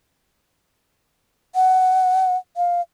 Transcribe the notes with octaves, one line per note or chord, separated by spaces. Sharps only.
F#5
F5